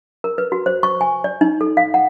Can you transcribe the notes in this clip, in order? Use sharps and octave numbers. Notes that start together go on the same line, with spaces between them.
A#4
B4
F#4
C5
C#6
G#5
D5
D#4
A4
F5
F#5